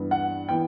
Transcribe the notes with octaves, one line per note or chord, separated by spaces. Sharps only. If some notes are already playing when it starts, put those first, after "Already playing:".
Already playing: G2 E3 B3
F#5
E3 B3 G5